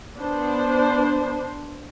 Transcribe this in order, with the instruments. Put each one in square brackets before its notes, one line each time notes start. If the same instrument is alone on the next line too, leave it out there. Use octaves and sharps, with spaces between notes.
[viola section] B3 D4 C5